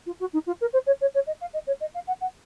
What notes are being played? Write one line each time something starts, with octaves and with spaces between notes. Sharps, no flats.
F4
F#4
D#4
F4
A#4
C5
C#5
C#5
C#5
D#5
F5
D#5
C#5
D#5
F5
F#5
F#5